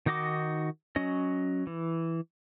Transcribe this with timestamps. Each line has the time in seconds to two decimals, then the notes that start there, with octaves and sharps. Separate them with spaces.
0.06 D#3 D#4 F#4 D#5 D6
0.96 F#3 C#4 D#5
1.67 E3